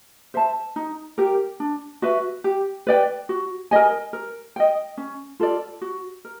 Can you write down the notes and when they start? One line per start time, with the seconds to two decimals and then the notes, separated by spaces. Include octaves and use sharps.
0.34 C5 E5 A5
0.76 D#4
1.18 G4 A#4
1.60 D4
2.02 F#4 B4 E5
2.44 G4
2.87 B4 D5 G5
3.29 F#4
3.71 A#4 D#5 G#5
4.13 A#4
4.56 D#5 G5
4.97 C#4
5.40 F4 A4 D5
5.81 F#4
6.25 A#4